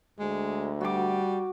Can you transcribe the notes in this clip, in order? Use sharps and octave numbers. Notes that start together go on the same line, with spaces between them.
D2 G#3
G3 F#4 D6